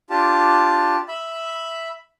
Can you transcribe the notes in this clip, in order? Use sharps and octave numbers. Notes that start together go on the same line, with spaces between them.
D4 F4 G4 A5
E5 B5